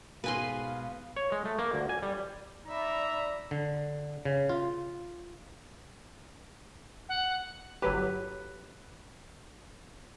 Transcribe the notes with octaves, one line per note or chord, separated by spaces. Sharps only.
G#2 B2 B4 F5 G#5 C6
C#5
G#3
A3
A#3
D2
G#5
G3
D#4 D5 E5 A#5 B5
D3
C#3
F4
F#5
G1 F#3 G4 B4